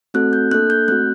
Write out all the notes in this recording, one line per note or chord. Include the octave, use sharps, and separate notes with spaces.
A3 C4 F#4 A4 F#6
G6
A#3 D4 A4 F#6
G6
A3 C4 F#4 F#6